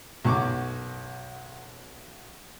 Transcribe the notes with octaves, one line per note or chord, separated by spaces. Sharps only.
B1 F#2 C#6 D6